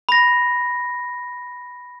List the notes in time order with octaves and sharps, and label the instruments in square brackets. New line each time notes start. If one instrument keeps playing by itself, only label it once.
[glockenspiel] B5 A#6